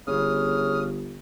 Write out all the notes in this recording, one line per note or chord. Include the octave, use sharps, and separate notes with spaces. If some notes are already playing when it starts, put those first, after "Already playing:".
G1 C#3 D#6 F6